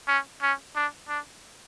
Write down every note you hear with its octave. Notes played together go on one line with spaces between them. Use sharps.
C#4
C#4
D4
D4